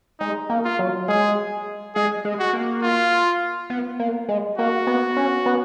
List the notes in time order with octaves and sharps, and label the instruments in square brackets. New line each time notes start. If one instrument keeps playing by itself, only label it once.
[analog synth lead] G#3 [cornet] D#4
[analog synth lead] A#3
[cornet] F4
[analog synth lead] F#3
[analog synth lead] G#3 [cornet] G#4
[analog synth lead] G#3 [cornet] G#4
[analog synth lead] G#3
[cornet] F#4
[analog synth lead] A#3
[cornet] F4
[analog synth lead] B3
A#3
G#3
[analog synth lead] A#3 [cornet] F#4
[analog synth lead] B3
C#4
B3